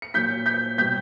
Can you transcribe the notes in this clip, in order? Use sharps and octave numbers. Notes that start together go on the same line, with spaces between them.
C#7
A#2 F#3 G6 B6
G6 B6
B2 G3 G6 B6